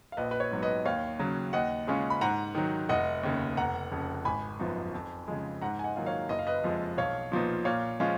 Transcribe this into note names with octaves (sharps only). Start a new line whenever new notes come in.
F5
A#1 B4 D#5
B4
C#5
G#2 F#3 B3
B4 D#5
D#2 C#5 F5
C#3 F#3
D#2 D#5 F#5
C#3 G#3 C#4 F4
B5
G#2 F#5 A#5
D#3 F#3
F1 D#5 F#5
D#2 C#3
F1 F#5 A#5
F2 C#3
G#1 G#5 B5
F#2 F3 B3 D#4
F2
C#3 F3 G#3
G#2 F#5 A#5
G#5
D#5 F#5
D#3 F#3 A#3 F4
C#5 F5
F#1 D#5
F5
B4 D#5
F2 F3 G#3
B1 C#5 F5
A#2 F3 B3 D#4
A#2 C#5 F5
F3 G#3 C#4 F4